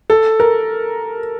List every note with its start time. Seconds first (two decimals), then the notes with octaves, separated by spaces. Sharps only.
0.10 A4
0.40 A#4